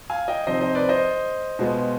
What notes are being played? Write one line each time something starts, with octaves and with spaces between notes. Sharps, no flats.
F5 G#5
D#5 G5
C3 F3 C4 D#4 C5 D#5
C5 D#5
B4 D5
C5 D#5
B2 G#3 B3 F4